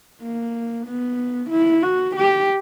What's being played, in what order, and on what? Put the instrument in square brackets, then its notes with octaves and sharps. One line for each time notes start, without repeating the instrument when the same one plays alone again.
[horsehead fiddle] A#3
B3
E4
F#4
G4